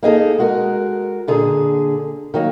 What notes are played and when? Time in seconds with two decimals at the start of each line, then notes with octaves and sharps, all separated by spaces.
0.03 A#3 D#4 G#4 A4
0.38 G#3 F#4 A#4
1.28 A#2 D3 G#4
2.34 D#3 F#3 A#3